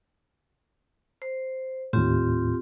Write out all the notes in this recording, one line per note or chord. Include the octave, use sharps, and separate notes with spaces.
C5
D#2 A2 C4 F4 G4